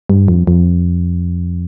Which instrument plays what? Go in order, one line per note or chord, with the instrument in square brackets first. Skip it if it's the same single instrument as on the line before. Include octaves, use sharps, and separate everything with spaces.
[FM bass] G2
F2
F2